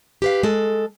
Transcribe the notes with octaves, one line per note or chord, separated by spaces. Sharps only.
G4 B4 F5
G#3 A4